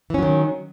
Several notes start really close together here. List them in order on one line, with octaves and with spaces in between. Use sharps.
E3 C#4 F#3 D#3